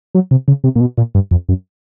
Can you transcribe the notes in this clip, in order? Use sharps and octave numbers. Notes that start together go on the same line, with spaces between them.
F#3
C3
C#3
C3
A#2
B2
A#2
G2
F2
F#2